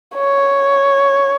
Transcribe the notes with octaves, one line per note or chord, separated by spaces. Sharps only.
C#5